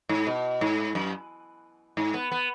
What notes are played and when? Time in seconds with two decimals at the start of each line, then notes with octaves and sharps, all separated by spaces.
0.09 G#2
0.27 B2
0.61 G#2
0.95 F#2
1.97 G#2
2.14 B3
2.32 B3